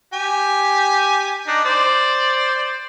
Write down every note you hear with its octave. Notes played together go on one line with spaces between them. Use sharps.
G4 G#5
D4 D#4
C5 D5